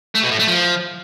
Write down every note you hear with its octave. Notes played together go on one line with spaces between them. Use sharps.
A3
B2
A2
A3
F3